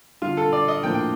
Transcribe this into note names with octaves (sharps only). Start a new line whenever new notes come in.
D3 G3 D4 F4
A4
D5
D#5
A2 F3 A#3 D4 G5
G5